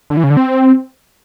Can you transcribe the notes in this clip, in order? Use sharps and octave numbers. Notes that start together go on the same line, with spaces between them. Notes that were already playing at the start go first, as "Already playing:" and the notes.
D3
E3
C#3
D3
C4